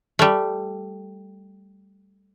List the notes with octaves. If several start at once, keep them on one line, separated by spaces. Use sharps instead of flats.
G3 A3